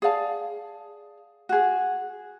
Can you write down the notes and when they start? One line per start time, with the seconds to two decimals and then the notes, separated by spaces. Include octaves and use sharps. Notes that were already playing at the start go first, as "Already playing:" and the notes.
0.02 G#4 D5 F5 A5
1.49 F#4 G#4